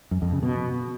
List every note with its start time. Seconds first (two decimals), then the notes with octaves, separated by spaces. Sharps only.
0.11 F#2
0.22 F2
0.32 C#3
0.43 B2